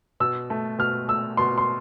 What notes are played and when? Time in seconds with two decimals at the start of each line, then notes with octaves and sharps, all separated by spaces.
0.20 B2 E6
0.50 A3
0.79 B2 F6
1.08 A3 E6
1.37 B2 C6
1.58 C6